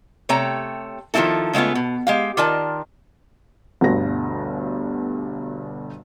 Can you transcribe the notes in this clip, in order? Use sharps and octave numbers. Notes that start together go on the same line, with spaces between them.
C3 A3 C#5 G5 A#5
D#3 F3 A3 A#3 E4 A4
C#3 G#3 A3 B3 F4
B2
G#3 G4 F5
D#3 F4 A#4 D5 A5
G1 D2 G2 B2 A#6